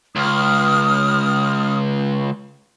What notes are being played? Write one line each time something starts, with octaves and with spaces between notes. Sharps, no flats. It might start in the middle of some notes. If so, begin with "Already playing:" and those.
C#2 D#6 F6